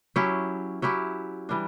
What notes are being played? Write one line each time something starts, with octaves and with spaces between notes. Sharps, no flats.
F#3 C#4 E4 G4
F#3 C#4 E4 G4
E3 G3 D4